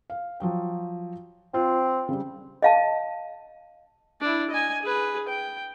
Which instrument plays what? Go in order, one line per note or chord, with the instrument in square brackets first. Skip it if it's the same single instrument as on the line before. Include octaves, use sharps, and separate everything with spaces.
[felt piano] F5
F3 F#3 G5
[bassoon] C4 [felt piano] F4
[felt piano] C#3 G3
[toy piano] D#5 F5 A5
[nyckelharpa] D4 E4
D#5 G#5
G#4 B4
G5